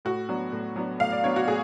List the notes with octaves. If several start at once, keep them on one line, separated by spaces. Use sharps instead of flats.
A2 F#4
F#3 B3 D4
A2
F#3 B3 D4
A2 F5
D5
F#3 B3 D4 C#5
F#4
A2 G#4